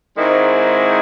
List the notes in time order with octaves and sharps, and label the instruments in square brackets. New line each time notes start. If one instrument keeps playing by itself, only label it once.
[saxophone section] G#2 D#3 G#3 C4 E4